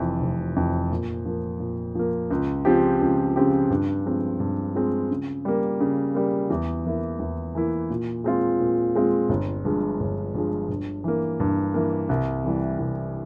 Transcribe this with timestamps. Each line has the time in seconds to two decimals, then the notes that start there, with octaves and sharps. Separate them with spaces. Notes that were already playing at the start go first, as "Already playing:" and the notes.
Already playing: F1 F2 E3
0.21 F1
0.56 F2 E3
0.91 A#2
1.25 F3 A#3
1.60 A#2
1.95 F3 A#3
2.30 C#2
2.65 C#3 F3 C4 G4
3.01 C#2
3.36 C#3 F3 C4 G4
3.70 G2
4.06 F3 G#3 C4
4.40 G2
4.75 F3 G#3 C4
5.11 C#3
5.45 G3 A#3
5.80 C#3
6.15 G3 A#3
6.50 E2
6.85 E3 A#3 E4
7.19 E2
7.55 E3 A#3 E4
7.90 A#2
8.24 G#3 C4 F4
8.60 A#2
8.95 G#3 C4 F4
9.29 G1
9.65 G2 F3 G#3
10.00 G1
10.34 G2 F3 G#3
10.69 G2
11.04 E3 A#3
11.40 G2
11.74 E3 A#3
12.09 C2
12.44 C3 E3 G3
12.79 C2